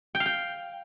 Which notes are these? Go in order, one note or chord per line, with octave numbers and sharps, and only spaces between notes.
G5
F5
G5